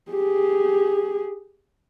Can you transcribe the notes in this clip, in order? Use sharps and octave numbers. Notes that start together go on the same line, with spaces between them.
G4 G#4